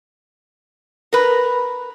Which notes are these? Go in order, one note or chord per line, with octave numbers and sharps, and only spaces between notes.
A#4 B4